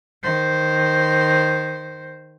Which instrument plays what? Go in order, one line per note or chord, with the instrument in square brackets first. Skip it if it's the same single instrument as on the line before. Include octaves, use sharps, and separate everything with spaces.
[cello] D#3 C5